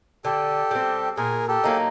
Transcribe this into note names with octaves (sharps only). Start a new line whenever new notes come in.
D3 G4 A4
G3 C4
A#2 G#4 A#4
G4 A4
F#3 A#3 D#4